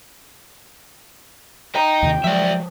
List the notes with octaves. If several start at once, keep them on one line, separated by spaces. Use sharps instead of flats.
D#5 G5 A#5
D#2 C3 D#3
F3 F#3 G#3 D5 E5